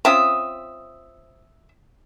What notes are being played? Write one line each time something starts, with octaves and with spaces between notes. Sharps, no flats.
C4 C#4 F4 E5 D#6